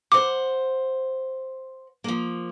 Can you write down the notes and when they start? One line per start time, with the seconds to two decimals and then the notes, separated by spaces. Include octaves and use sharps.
0.12 C5 F#5 D6
2.04 F3 A#3